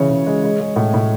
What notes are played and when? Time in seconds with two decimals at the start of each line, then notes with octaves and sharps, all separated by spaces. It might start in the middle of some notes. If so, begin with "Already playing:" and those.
Already playing: C#3 E3 C#5
0.10 C#3
0.27 G#3
0.44 G#3
0.60 G#3
0.76 A2
0.94 A2